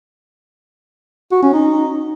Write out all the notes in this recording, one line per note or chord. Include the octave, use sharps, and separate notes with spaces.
F#4
C#4
D#4